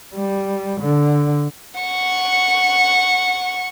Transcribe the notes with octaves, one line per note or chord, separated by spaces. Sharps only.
G3
D3
F#5 C#6